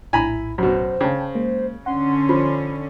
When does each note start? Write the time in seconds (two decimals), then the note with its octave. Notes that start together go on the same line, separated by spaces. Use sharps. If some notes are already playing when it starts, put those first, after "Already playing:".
0.13 A#1 A2 E4 G#5 A#5 B5
0.58 F#2 B2 C5
1.01 C#3 G5 A5
1.35 G#3 A#3
1.86 D3 C#4 F#5 C6
2.29 F3 B5